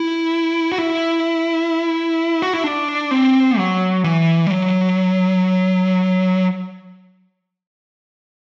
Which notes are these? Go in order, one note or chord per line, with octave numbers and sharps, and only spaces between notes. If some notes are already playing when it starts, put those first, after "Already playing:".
Already playing: E4
F#4
E4
F#4
E4
D4
C4
F#3
E3
G3
F#3